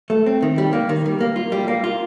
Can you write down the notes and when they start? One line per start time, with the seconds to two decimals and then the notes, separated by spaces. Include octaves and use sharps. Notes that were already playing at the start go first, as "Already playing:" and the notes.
0.10 A3
0.26 C4
0.42 D#3
0.58 G3
0.73 A#3
0.89 D#3
1.06 G3
1.21 A#3
1.36 F4
1.52 G3
1.68 A#3
1.84 F4